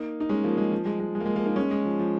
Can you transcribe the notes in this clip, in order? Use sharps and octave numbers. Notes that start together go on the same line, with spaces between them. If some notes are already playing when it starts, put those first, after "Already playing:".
Already playing: A#3 D#4
D#4
G#3 C#4
F3 A#3
G#3
F3
G#3
G#3
G#3
A#3
G#3
F3 A#3
A#3 D#4
G#3 C#4
G#3
F3
F3